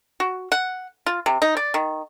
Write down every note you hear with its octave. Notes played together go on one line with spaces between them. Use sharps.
F#4
F#5
F4
C3
D#4
D5
D#3